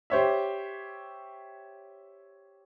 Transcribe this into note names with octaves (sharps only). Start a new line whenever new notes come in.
G4 C5 C#5 E5